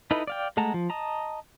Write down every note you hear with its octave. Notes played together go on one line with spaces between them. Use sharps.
D#4 E4 A4 B4 D#5
D5 F5 G5
G#3 A3 F#5 A5 A#5
F3
D#5 A5 A#5